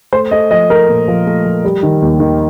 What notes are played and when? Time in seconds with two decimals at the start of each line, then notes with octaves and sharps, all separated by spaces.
0.13 A3 C5
0.31 A3 D#5
0.51 F3 D#5
0.70 A3 A#4
0.88 A#2
1.08 F3
1.27 A3
1.45 F3
1.65 G3
1.83 D#3
2.02 D#2
2.20 D#3